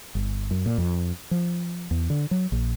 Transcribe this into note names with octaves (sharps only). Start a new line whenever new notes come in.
G1
F#2
A#2
F2
F3
E2
D3
F#3
A#1